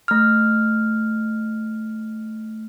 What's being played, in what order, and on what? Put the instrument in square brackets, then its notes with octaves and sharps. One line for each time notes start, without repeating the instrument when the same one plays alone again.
[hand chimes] A3 F6